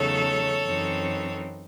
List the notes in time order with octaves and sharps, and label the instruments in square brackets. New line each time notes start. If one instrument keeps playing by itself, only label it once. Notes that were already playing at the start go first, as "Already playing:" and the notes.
Already playing: [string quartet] E2 C#3 F#3 A3 D#4 A4 C#5
F#2 E3 C4 D#4